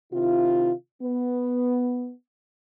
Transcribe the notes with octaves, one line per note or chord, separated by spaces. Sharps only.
C3 D#3 E4 F4
B3